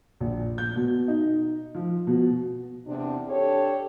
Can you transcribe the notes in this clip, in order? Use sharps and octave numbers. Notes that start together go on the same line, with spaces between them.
A#1
G6
B2
D#4
F3
B2
E2 C3 D4
D4 G4 A4 C#5